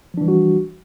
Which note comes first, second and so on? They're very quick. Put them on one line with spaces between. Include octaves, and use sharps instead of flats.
F3 D4 E3 G3 F#4